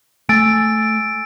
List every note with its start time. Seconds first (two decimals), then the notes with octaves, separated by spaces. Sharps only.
0.29 A3 G#5 E6 A6 D7